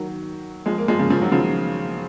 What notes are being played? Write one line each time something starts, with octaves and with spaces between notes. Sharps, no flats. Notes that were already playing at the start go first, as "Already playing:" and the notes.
Already playing: D#3 F#3
F3 G#3
A#3
F3 G#3
C#3 F3
C#3 F3
D#3 F#3
C#3 F3